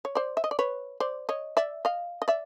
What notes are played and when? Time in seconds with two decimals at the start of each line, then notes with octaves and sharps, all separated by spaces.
0.05 C#5
0.15 C5 D5
0.37 E5
0.44 D#5
0.51 D5
0.59 B4 C#5
1.00 C5 D5
1.29 C#5 D#5
1.57 D5 E5
1.85 D#5 F5
2.22 D#5
2.28 D5 E5